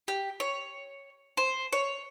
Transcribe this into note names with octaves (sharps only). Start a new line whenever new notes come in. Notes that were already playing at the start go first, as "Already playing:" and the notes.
G4
C#5
C5
C#5